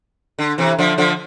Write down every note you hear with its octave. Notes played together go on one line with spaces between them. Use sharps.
D3
C3 E3
D3 F3
D3 F3